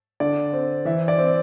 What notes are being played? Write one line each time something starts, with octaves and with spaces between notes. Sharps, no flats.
D3 D5
C4
E3 E5
D5
C4